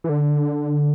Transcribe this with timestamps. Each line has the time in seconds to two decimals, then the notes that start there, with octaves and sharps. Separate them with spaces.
0.04 E3
0.09 D3